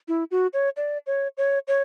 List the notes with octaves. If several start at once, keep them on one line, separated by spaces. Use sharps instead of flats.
E4
F#4
C#5
D5
C#5
C#5
C#5